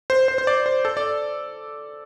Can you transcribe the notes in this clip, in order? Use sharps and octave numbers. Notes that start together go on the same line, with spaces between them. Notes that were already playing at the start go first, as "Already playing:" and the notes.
C5
C5
C5
D5
C5
A4
D5